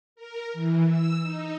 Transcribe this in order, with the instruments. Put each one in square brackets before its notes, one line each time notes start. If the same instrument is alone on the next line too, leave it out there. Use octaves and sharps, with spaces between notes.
[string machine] A#4
E3
E6
D#4